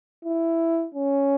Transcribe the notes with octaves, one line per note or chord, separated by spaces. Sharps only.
E4
C#4